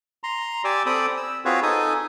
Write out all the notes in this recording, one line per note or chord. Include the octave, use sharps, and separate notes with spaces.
A#5 C6
G4 D5 G#5 D6 E6
C4 A4 D5 G5 B5 D#6
E6
C4 F4 F#4 G#4 B4 C#5
D#4 A4 G#5 D#6